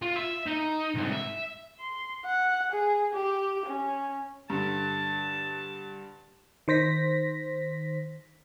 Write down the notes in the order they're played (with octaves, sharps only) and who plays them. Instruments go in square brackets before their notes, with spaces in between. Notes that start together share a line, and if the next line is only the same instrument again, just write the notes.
[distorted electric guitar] F4
E5
D#4
C2 G#2
E5
[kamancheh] C6
F#5
G#4
G4
C#4
[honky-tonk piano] G2 D3 [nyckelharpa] A5
[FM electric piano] D#3 C5 A#6 B6